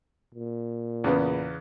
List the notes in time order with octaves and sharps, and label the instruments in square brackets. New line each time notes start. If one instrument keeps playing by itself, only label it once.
[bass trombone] A#2
[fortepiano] E2 C#3 B3